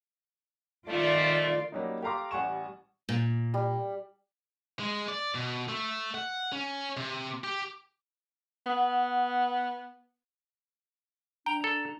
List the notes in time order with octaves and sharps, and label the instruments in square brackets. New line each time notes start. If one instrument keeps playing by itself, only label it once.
[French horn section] A#2 F3 A3 [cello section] D#3 F4 D5
[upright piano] F#3 G3 A#3 C#4 D#4
G4 A4 F5 A#5 C6 D6
A1 G3 F#5 G#5 C#6 E7
[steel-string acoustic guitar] A#2
[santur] G3
[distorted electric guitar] G#3
D5
B2
A3
F#5
C#4
C3
G4
[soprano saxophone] B3 [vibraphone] F#5 D#6
[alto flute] D4 [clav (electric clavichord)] G5 [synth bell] A#5 F7
[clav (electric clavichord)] A4